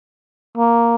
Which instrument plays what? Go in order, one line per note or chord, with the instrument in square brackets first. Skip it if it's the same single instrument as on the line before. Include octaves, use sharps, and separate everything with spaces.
[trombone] A#3